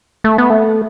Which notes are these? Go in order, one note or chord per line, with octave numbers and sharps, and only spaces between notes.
A3
B3
A3